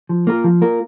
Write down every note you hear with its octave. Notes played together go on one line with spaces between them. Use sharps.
F3
A#3 F4 A#4
F3
A#3 F4 A#4